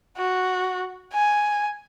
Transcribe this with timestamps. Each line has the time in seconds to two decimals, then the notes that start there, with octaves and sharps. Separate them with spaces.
0.18 F#4
1.13 G#5